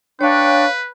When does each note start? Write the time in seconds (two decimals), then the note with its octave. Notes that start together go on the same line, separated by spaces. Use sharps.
0.21 D4 B4 C#5 F5 G5 C#6